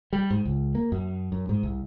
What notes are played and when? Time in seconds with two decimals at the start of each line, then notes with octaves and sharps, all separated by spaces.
0.13 G3
0.30 G#2
0.45 C#2
0.75 A#3
0.92 F#2
1.32 F#2
1.49 G#2
1.63 C2